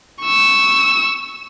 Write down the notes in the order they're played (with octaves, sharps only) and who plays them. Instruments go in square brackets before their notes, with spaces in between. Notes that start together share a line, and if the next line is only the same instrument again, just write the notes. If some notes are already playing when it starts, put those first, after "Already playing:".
[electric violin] C#6 E6